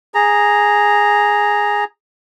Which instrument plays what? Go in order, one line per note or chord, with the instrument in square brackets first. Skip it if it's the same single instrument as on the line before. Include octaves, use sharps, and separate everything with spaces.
[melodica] G#4 A#5